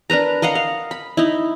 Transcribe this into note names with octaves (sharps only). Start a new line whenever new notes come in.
D4 A#4 B4 A#5
A#4 D#5 F5 F#5
F5
B5
D#4 E4